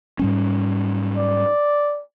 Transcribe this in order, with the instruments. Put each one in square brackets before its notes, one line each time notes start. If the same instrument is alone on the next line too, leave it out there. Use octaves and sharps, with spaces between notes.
[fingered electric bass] G#2 G3 C#4
[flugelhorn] D5